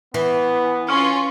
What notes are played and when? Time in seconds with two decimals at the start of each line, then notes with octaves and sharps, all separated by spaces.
0.14 E3 B3
0.89 C#4 F4 C6 C#6 F6